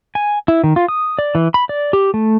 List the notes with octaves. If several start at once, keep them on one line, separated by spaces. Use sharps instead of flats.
G#5
E4
D#3
F4
D#6
D5
E3
B5
D5
G4
A3